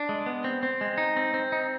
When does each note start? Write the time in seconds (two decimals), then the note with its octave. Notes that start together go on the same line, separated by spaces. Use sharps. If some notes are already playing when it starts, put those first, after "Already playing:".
Already playing: D4
0.09 G#3
0.26 B3
0.44 C4
0.63 C4
0.81 G#3
0.98 D#4
1.16 C4
1.34 C4
1.52 D#4